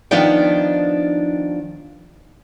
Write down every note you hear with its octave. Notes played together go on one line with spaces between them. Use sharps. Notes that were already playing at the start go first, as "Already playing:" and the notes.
D#3 F3 B3 D4 D#4 G5